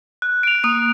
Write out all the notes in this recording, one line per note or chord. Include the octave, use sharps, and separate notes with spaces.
F#6
D7 F7
A#3 D#6